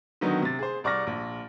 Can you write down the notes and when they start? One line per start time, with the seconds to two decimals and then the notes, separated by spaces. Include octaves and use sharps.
0.21 D3 D#3 F#3 B3 D#4
0.42 C3 A6
0.59 G#4 C5
0.84 C2 D5 C#6 F6 A#6
1.07 A#1